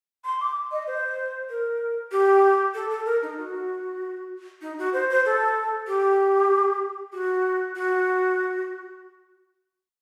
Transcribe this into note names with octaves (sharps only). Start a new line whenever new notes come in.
C6
D6
D#5
C5
A#4
G4
A4
A4
A#4
D#4
F#4
D#4
F#4
C5
C5
A4
G4
F#4
F#4